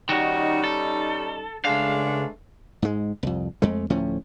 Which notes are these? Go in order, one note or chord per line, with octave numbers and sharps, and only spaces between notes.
D#3 G3 C#4 D#4 F#4
A4
C#2 G#3 A3 D4 F5
G#2 G#3
C2 F2
F2 G#3 A3
D2 A2 F3 C#4